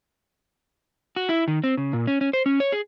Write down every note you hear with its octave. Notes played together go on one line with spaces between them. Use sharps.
F#4
E4
D#3
C4
C#3
A#2
C#4
C#4
C5
C#4
C#5
G#4